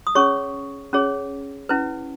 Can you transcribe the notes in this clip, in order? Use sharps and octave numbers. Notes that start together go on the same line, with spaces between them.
D#6
C#4 G#4 C#5 C#6
C#4 G#4 C#5
C#4 E4 B4